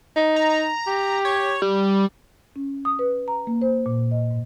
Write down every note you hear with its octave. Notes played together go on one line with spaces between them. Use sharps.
D#4
A#5
G4
C#5
G3
C#4
D#6
B4
A#5
A#3
C5
A#2
D#5
G#2